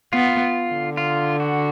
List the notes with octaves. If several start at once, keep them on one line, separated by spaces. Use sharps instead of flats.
B3 F4
D3
F4
F#4